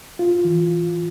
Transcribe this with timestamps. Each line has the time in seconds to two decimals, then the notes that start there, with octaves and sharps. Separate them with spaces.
0.19 F4
0.45 E3